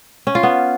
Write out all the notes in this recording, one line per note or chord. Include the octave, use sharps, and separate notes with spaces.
C#4
F4
B3